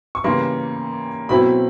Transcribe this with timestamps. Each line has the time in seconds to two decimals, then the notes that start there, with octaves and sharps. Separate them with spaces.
0.15 C#6
0.24 C#3 E3 G3 A#3 C6
1.29 B2 F#3 A3 C4 E4 B5